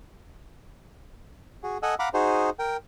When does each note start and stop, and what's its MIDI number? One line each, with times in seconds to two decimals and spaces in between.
1.63 1.78 66
1.63 1.78 68
1.83 1.95 69
1.83 1.95 75
1.83 1.95 78
1.83 1.95 80
1.83 1.95 88
1.99 2.09 77
1.99 2.09 78
1.99 2.09 82
1.99 2.09 83
1.99 2.09 86
2.14 2.50 63
2.14 2.50 66
2.14 2.50 68
2.14 2.50 72
2.59 2.77 70
2.59 2.77 79